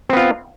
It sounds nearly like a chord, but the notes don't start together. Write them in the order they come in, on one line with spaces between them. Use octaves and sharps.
C4 B3 F4